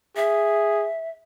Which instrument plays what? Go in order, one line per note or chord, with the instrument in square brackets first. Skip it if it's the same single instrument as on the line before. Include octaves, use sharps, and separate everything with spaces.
[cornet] G#4 [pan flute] E5